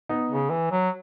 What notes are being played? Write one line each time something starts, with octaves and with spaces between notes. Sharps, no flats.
B3 D#4
C#3
E3
F#3